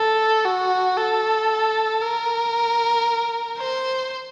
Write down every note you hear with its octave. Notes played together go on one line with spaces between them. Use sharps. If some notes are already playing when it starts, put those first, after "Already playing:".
Already playing: A4
F#4
A4
A#4
C5